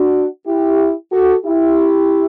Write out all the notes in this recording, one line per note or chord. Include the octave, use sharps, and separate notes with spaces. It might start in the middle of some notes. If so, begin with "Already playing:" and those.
Already playing: D4 F#4
E4 G4
F#4 A4
E4 G4